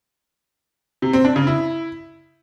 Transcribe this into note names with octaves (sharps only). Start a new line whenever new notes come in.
C3
C4
D4
C#3
E4